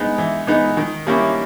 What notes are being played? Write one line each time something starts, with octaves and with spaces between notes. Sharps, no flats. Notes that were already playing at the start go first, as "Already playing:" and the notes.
Already playing: G#3 B3 D#4
E3
G#3 B3 D#4
D#3
G3 A#3 C#4 E4